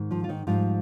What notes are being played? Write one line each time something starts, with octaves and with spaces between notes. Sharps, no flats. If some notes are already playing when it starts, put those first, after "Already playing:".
Already playing: G#2 D#3
F3 F4
F4
D#3 D#4
G#2 F3 G3 F4